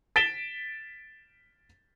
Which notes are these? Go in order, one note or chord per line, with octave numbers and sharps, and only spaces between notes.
A6 B6 D7 E7 G7